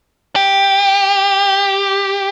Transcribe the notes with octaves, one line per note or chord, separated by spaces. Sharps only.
G4